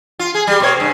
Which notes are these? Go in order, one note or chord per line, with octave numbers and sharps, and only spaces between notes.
F4
G#4
G3
B2 A#3 C#5
G2 C#3